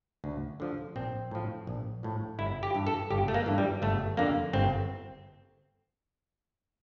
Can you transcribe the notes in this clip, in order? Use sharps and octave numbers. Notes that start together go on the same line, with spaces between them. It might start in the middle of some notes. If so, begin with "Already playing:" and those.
D2
D3 F3
A#1 C4
A2 F3
A#1
A2 F3
G1 E4
G4
G2 E3
A4
G1 G4
A3
A#3
G2 E3
G3
G1 A3
F2 D3 A#3
G1 C4